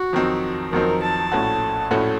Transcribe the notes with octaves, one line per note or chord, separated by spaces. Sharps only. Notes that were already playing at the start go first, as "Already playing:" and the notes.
Already playing: F#4
F2 D#3 F#3 C4 D#4
F2 D#3 F#3 C4 D#4 A#4
A5
A#1 A2 A3 C#4 F#4
A#1 A2 A3 C#4 F#4